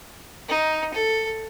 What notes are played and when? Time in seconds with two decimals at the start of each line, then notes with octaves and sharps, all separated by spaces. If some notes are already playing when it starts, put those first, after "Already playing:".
0.48 D#4
0.94 A4